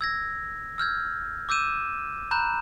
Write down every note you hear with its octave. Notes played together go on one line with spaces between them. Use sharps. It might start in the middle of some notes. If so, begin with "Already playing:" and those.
E6 G#6 A#6
E6 F6 G6 G#6
D6 E6 G6 D#7 E7
A#5 B5 F#6 G6 E7